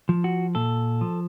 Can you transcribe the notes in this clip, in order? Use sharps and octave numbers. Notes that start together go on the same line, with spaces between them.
F3
F#4
A#2 A4
F3